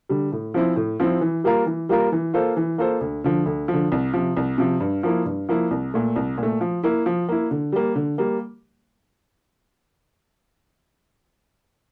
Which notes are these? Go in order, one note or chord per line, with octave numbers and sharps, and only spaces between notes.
D3 G3
A2
F3 C4 E4
A2
F3 C4 E4
E3
G3 A#3 F4 A#4
E3
G3 A#3 F4 A#4
E3
A#3 F4 A4 C5
E3
A#3 F4 A4 C5
D2
D3 F3
D2
F3
D3
C2
C3 F3
C2
C3 F3
G2
F3 A#3 E4
G2
F3 A#3 E4
C2
A#2 A3
C2
A#2
A3
F3
A#3 E4
F3
A#3 E4
D3
G3 A#3
D3
G3 A#3